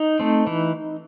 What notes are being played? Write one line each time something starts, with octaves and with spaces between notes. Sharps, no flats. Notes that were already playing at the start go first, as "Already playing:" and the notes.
Already playing: D#4
A3 C4
E3